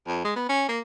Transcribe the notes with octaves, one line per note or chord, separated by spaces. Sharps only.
F2
G#3
B3
C#4
A#3